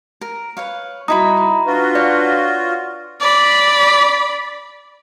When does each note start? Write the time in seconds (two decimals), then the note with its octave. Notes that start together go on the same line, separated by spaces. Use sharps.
0.21 A#4
0.57 B4 C#5 F5
1.08 G3 D#4 E4 F#4 A#5 B5 D#6
1.37 A#5
1.67 D4 F4 F#4 B4
1.95 C#5 D5
3.20 D5 B5